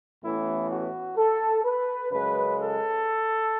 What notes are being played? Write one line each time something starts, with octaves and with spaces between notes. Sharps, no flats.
A1 A2 E3 B3 E4
F#4
A4
B4
F#2 C#3 G#3 B4
A4